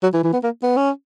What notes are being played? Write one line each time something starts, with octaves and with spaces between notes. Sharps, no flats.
F#3
E3
E3
B3
A#3
B3
C#4